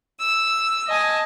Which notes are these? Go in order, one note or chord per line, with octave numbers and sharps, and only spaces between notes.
E6
D#5 G#5 A5